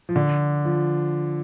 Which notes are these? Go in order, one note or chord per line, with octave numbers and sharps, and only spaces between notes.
F3
D3
F3